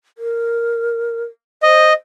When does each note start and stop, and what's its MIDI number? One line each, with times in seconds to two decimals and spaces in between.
0.18 1.23 70
1.63 1.89 72
1.63 1.93 75